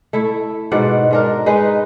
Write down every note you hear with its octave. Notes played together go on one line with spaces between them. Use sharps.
A3 E4
G#2 B2 D5 F#5
G#2 D4 A#4
G#3 D#4 B4